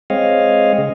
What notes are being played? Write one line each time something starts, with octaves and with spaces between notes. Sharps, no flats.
G#3 C4 C#5 D#5 F5
C#3